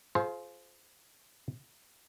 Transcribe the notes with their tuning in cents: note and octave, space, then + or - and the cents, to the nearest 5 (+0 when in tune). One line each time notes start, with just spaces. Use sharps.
F4 +0 G#4 +40 C5 +0